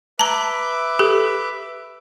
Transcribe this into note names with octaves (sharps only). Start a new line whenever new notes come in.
B4 E5 A5 A#5 D6
G4 A4